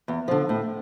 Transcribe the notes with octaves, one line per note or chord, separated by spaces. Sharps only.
E2
D3 F3
A2